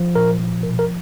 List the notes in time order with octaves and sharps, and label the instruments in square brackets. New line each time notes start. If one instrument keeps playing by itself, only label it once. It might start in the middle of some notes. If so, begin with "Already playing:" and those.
Already playing: [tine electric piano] F3
A#2 A#4
F3
B2 A#4
A#4